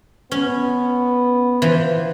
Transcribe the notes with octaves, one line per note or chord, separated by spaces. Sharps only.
B3 C#4
E3 F3